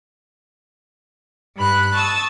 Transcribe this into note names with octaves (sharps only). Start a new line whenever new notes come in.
G2 B5 F#6
A5 C#6 D#6 E6